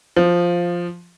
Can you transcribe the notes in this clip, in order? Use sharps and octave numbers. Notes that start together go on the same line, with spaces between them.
F3